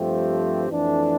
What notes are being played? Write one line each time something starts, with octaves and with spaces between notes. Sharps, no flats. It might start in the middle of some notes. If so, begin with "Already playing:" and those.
Already playing: G2 F3 A3 C4 G4
F2 E3 A3 D4